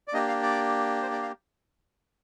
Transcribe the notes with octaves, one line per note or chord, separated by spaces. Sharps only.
D5
A#3 D4 G4 D#5
F5
D5
C5
D5
F5